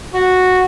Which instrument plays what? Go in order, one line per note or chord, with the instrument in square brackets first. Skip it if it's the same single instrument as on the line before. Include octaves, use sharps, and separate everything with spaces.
[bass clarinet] F#4